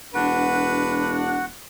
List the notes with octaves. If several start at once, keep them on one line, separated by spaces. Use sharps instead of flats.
E1 D4 F#4 B4 F#5